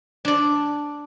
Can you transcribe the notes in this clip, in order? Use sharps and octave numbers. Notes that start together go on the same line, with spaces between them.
D4 D5